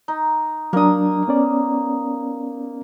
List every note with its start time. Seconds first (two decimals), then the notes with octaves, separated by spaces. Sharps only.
0.08 D#4
0.73 F#3 A#3 D4 D#6
1.28 B3 C#4 D5